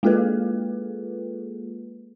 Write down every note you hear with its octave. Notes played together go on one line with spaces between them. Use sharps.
G#3 A#3 F4 G#4 A4 B4